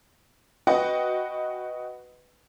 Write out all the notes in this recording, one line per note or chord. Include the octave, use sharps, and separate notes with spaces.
F#4 B4 D#5 F#5 G5